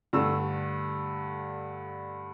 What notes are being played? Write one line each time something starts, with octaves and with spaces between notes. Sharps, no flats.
G2 D3 A3 E6